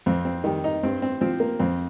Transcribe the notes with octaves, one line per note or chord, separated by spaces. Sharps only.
F2 C4
C4
D#3 G3
D#4
G2 C4
C4
F3 C4
A#3
F2 C4